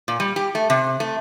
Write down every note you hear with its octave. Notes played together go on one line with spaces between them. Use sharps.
A#2
G3
G4
A3
C3
A3